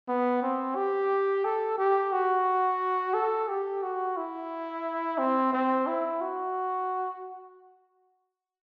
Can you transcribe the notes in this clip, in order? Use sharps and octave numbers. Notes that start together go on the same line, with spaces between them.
B3
C4
G4
A4
G4
F#4
A4
G4
F#4
E4
C4
C4
E4
F#4